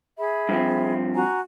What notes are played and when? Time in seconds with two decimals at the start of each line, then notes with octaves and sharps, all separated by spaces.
0.18 G#4 E5 B5
0.49 G2 F3 C4
1.15 F#4 G#5 A#5